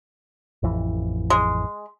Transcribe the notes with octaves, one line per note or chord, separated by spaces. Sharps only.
A1 F2 E3
G#3